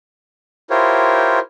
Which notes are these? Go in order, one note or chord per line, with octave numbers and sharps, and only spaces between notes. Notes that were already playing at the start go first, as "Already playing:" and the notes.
E4 F4 G4 A#4 C5 C#5